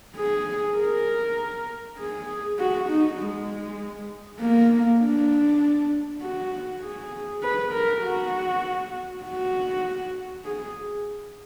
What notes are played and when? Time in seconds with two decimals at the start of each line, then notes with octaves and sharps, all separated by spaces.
0.16 G#4
0.77 A#4
1.98 G#4
2.59 F#4
2.89 D#4
3.19 G#3
4.40 A#3
5.01 D4
6.21 F#4
6.81 G#4
7.43 B4
7.72 A#4
8.03 F#4
9.23 F#4
10.44 G#4